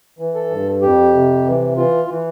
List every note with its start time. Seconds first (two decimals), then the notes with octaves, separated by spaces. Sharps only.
0.19 E3
0.35 A4
0.50 G2
0.82 F2 G4
1.14 C3
1.46 E3
1.77 E3 F4
2.09 E3